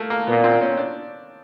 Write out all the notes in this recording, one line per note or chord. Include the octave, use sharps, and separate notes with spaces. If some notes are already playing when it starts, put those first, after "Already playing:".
Already playing: A3 A#3
A#3
A#2 B3
C4
C#4
D4